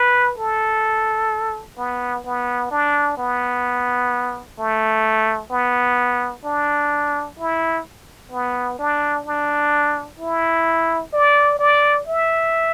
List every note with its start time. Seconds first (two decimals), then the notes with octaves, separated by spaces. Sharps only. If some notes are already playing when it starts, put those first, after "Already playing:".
Already playing: B4
0.38 A4
1.78 B3
2.25 B3
2.71 D4
3.18 B3
4.59 A3
5.51 B3
6.45 D4
7.39 E4
8.32 B3
8.79 D4
9.26 D4
10.20 E4
11.13 D5
11.59 D5
12.07 E5